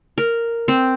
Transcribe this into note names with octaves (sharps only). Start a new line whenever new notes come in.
A#4
C4